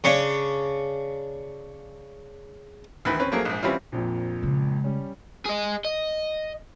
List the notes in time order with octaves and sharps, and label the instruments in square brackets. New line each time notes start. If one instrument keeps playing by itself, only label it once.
[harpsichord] C#3 C#4 D4
[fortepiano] D2 D#3 E3 B5
C4 C#4 B4
F3 F#3 A3 A#3 G#4 A#4
A#1 G#2
E3 G3 C4 C#4 E4 F4
[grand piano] A#1 F2 A#2
[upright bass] C#3 G#3
[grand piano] G3 C#4
[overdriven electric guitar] G#4 D#5
D#5